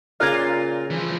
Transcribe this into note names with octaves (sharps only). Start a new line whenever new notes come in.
A#2 C#3 F4 A#4 D5 F6 F#6 G#6
E3 F3